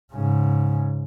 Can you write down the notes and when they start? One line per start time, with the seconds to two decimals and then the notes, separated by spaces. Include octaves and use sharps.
0.13 G#2 C#3